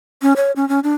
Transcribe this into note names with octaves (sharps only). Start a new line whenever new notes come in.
C#4
C#5
C#4
C#4
D4